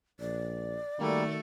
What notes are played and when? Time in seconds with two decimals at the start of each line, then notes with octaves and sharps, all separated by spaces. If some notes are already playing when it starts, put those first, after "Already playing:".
0.20 A#1 D5
1.00 D#3 G3 A3 A#3 F#4 A4